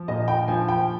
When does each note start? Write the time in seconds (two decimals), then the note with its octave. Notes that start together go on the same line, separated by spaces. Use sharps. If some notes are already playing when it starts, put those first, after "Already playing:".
Already playing: F3
0.08 A#2 D#5
0.28 G5
0.48 F3 G#5
0.69 G5